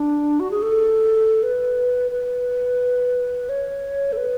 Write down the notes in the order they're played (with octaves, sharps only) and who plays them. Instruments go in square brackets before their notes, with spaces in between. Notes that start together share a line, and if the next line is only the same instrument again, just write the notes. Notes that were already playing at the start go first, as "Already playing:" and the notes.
Already playing: [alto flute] D4
F#4
G#4
A4
B4
B4
C#5
A4
B4